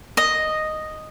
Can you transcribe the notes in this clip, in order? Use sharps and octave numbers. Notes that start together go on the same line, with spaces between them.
D#5